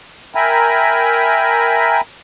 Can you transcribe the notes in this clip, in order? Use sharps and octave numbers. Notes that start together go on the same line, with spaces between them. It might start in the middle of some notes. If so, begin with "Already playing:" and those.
A#4 E5 G5 G#5 A#5 B5